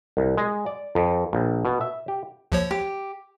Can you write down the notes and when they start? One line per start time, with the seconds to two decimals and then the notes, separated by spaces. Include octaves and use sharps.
0.17 C2
0.37 G#3
0.66 D5
0.95 F2
1.33 A#1
1.65 B2
1.81 E5
2.08 G4
2.52 D#2 F3 C#5
2.71 G4